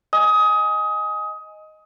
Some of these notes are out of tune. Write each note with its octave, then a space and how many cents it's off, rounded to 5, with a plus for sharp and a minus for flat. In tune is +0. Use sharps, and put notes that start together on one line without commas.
D#5 +0 G#5 +0 D#6 +20